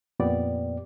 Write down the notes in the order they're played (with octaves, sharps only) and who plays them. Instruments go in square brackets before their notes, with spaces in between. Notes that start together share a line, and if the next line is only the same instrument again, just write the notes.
[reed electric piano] F2 A#2 B3 G4 D5